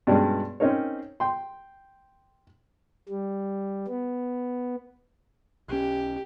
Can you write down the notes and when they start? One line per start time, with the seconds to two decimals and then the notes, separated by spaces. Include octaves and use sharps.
0.07 G2 B2 G#3 C#4 D5
0.60 C4 C#4 D#4 A#4 C#5
1.20 G5 C6
3.09 G3
3.88 B3
5.68 B1 C#4 G4